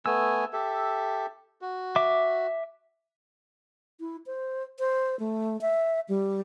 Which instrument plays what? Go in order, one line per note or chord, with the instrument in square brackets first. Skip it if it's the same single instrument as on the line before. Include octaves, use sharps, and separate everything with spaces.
[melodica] A3 B3 G#5 [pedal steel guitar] E6
[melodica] G4 A4 E5
F#4
[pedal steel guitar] E5 D6
[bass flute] E4
C5
C5
A3
E5
G3